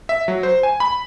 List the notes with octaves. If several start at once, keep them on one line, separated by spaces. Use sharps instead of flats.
E5
F#3
C5
G#5
B5